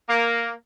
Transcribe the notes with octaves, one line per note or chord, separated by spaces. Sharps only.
A#3